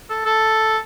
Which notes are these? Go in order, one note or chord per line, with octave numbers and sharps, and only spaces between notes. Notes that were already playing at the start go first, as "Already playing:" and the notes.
A4
A4